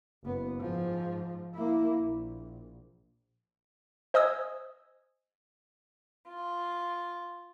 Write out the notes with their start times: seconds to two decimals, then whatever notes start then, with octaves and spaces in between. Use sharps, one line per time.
0.25 F#1 B3
0.56 G#2 F3
1.55 A#3 E4
2.01 A#1
4.14 C5 D#5 G#5 D#6 E6 G#6
6.27 F4